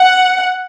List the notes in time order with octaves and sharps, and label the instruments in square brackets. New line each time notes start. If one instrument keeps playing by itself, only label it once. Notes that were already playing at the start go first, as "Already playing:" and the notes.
Already playing: [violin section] F#5